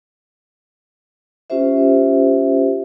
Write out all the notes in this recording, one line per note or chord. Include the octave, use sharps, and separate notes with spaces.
C#4 F4 G4 C5 E5